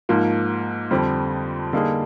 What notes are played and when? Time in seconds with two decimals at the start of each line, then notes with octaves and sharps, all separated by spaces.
0.09 G#2 F3 A#3
0.91 F2 D3 G3 C4
1.73 D3 G3 A#3 D#4 G#4